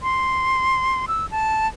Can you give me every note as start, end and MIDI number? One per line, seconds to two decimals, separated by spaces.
0.02 1.06 84
1.08 1.26 88
1.31 1.67 81